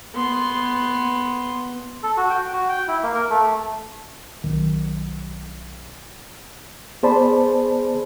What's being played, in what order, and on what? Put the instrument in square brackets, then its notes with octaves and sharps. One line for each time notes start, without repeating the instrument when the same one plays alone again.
[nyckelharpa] B3 C6
[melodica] A4
F#4
G5
F#4
G5
E4
A#3
A#4
A3
[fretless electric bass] B1 D#3
[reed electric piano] B3 G#4 C5 D5 A5 B5